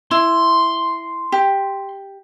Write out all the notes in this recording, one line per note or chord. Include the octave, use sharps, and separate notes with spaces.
E4 C6
G4